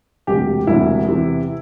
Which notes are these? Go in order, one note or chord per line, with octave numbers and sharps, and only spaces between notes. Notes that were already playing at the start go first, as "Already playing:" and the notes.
E1 D2 C3 G4
E1 D2 C3 E4
E2 C3 E3